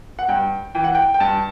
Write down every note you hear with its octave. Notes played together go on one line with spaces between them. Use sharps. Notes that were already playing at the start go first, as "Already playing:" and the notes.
F#5
G2 G5
E3 G5
F#5
G5
G5
G2 A5